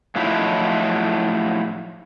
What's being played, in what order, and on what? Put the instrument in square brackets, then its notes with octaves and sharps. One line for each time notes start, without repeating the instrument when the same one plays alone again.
[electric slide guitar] A2 F3 F#3 D#4 E4